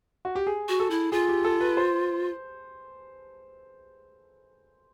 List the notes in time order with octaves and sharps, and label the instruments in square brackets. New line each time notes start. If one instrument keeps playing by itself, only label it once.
[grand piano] F#4
G4
G#4
[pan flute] F#4
[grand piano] A4
[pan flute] E4
[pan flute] F4 [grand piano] G#4
[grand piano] G4
A4
B4
C5